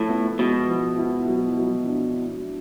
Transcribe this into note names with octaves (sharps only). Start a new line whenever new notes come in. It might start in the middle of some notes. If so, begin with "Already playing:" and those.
Already playing: A2 F3 E4
B3
B2 G#3
F3
E4
F#3
F#3
D4